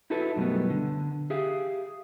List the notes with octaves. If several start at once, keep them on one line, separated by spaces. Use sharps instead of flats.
D#4 E4 F#4 A4 B4 E5
F#2 B2 G3 A3 B3
D3
G4 G#4 E5 F5